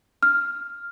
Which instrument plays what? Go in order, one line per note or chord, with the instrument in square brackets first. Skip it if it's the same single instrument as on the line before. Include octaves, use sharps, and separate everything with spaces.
[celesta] F6